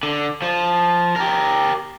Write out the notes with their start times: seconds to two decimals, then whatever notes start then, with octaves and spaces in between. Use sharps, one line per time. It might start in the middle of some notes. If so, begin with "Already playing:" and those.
0.03 D3
0.42 F3
1.16 G4 A#4